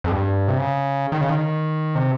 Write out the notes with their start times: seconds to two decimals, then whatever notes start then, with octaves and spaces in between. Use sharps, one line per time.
0.04 F2
0.12 G2
0.48 C3
0.58 C#3
1.12 D#3
1.21 C#3
1.30 D#3
1.95 C3